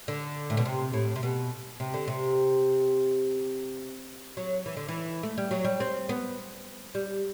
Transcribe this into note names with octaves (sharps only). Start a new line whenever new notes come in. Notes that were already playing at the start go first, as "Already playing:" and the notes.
D3
A2
B2
C3
A2
C3
B2
C3
D3
C3
F#3
E3
D3
E3
A3
G3
F#3
G3
C4
B3
G3